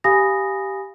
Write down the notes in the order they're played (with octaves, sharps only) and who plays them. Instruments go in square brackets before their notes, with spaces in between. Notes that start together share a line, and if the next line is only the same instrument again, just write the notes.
[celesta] G4 F5 G#5 B5 D#6 A#6